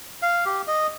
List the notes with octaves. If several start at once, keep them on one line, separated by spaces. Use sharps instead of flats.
F5
G4
D#5